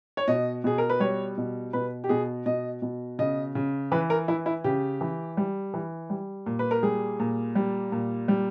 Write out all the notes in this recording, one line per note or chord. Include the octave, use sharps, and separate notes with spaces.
C#5
B2 D#5
B2 G#4
A#4
B4
G3 C#5
B2
B2 B4
G4
B2 G#4
B2 D#5
B2
C#3 D#5
C#3
E3 B4
A#4
E3 E4
E4
C#3 G4
E3
G3
E3
G3
A#2
B4
A#4
G3 G#4
A#2
G3
A#2
G3